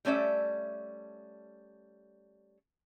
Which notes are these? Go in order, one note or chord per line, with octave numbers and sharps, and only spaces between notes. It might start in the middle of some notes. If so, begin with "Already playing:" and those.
G3 A3 C#4 D5 E5